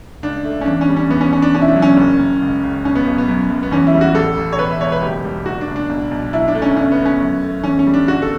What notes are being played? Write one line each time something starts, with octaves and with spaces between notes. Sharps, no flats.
C#2 D4
A3
C#4
E2 D4
C#4
G3
C#4
E2 B3
C#4
E2 C#4
D4
E1 C#4
E4
D4
F#3
C#4
F#1
F#1
C#2
C#2
B1 C#4
B3
B1
B3
F#2
F#2
B3
E2 C#4
E4
G3
F#4
A1 A4
A1
C#5
E1 B4
E5
E1 C#5
B4
F#1 G4
G3
F#1 F#4
D4
F#1
D4
B1
B1
B1 E4
D4
A3
C#4
G1 C#4
B3
A3
C#4
F#2
A3
E2 C#4
C#4
G3
D4
G1 F#4
A4